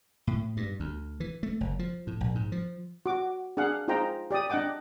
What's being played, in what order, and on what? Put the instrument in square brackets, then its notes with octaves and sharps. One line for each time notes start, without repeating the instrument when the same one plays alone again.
[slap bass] A2
G2
D2
E3
A3
F#1
F3
A2
A#1
G#2
F3
[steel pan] F#4 D6
D4 G#4 F5 F#5
D#4 F4 G#4 C5 G5 A#5
G4 D5 G5 D#6
D4 D#5 F#5 G5 D6